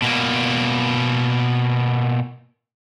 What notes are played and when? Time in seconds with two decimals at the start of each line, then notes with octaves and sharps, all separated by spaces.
0.02 B2 A#3